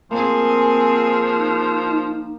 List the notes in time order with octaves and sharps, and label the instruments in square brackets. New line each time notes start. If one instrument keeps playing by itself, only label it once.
[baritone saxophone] F3 [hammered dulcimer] A#3 [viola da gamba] C4 G#4 [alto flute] G#5
[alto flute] D#4